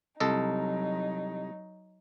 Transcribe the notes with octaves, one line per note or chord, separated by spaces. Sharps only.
C2 F#3 D#4 A4 D#5